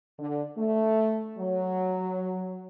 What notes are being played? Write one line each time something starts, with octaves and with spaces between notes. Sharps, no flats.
D3
A3
F#3